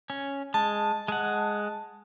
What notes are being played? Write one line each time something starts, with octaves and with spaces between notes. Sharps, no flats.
C#4
G#3 A5
G#3 F#5